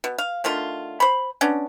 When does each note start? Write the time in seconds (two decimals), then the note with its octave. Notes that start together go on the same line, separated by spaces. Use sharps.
0.04 B2
0.18 F5
0.44 D3 D#3 A3 F4
1.00 C5 B5
1.41 B3 C#4 D4